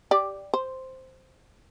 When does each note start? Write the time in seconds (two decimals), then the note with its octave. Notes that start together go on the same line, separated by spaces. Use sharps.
0.11 G4 D5
0.54 C5